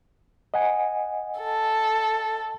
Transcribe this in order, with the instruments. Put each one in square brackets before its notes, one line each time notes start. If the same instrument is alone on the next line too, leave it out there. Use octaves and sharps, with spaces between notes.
[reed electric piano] D#5 F#5 G#5
[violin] A4